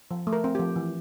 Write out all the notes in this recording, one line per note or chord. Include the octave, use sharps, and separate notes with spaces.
F3
A3
A#4
C4
F3 G4
E3